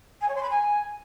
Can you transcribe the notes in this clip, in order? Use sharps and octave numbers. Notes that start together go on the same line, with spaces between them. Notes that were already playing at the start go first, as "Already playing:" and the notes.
G#5
C#5
C6
B5
G#5